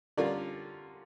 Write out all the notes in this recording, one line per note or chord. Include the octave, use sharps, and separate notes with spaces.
D3 G3 C#4 F4 A#4 D5